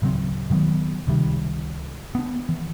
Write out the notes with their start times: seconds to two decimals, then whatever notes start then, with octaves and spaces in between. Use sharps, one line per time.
0.02 D1 C#3 F#3 C4
0.50 B2 D#3 F#3 B3
1.07 C#2 C3 D#3 G3
2.15 B3 D4
2.49 E3